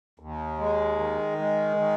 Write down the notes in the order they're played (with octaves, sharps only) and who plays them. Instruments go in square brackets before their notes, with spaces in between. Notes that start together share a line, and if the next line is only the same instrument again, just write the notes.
[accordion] D#2
G#3
D#3
G#3
D#3